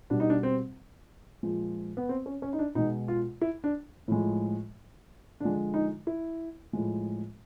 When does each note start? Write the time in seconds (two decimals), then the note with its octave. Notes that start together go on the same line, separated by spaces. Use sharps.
0.10 B2 G3 D4
0.20 D#4
0.30 D4
0.43 C4
1.43 A#2 F3 G#3
1.97 B3
2.09 C4
2.26 C#4
2.42 C#4
2.53 D#4
2.59 D4
2.75 B2 G#3 D#4
3.08 F4
3.41 E4
3.64 D4
4.08 A2 F3 G#3
5.40 D3 F3 G#3 D4
5.74 D#4
6.07 E4
6.73 A2 F3 G#3